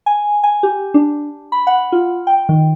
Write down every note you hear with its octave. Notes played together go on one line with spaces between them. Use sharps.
G#5
G#5
G4
D4
B5
F#5
F4
G5
D#3